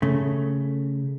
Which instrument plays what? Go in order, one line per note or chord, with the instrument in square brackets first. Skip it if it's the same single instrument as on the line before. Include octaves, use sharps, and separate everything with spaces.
[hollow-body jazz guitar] C#3 A3